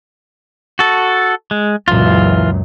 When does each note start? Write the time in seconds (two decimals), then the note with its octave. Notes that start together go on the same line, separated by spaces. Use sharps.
0.79 F#4 A4
1.51 G#3
1.88 C#2 F#2 A#2 E3 F4